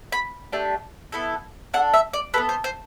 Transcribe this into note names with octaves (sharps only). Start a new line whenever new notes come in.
B5
A3 D4 G4
B3 E4 A4
D4 A4 F#5
E5
D5
B3 E4 A4 B4
C5
C5